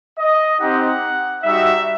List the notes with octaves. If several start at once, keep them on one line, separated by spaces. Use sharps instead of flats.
D#5
C4 D#4 G4 F#5
G3 D#4 F#4 E5